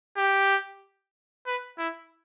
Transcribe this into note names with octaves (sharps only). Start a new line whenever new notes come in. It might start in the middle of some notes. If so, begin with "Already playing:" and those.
G4
B4
E4